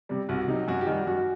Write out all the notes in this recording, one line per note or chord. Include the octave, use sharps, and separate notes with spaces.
C3 G3
C2 F#4
C3 F#3 D#4
F#2 F#4
G4
D#3 G3 F#4
F#2 F#4